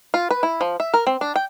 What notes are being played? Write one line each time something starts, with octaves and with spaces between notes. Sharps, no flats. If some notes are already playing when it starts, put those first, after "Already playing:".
F4
B4
E4
F3
E5
A#4
C4
D4
G5